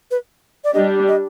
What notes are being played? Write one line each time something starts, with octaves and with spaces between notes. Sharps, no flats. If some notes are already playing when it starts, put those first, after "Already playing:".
B4
D5
G3 D4 G4 D#5
D#5